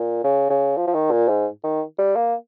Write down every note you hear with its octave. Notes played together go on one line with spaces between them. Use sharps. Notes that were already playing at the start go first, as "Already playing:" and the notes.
Already playing: A#2
C#3
C#3
F3
F3
D#3
A#2
G#2
D#3
G3
A#3